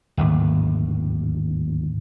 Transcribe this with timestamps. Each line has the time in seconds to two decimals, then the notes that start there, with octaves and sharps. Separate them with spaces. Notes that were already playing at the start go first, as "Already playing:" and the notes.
0.17 D1 G#1 D#2